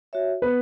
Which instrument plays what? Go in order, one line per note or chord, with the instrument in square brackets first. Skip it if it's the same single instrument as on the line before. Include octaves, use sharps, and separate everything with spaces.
[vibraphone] F#4 C#5 E5
[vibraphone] B3 [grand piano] B4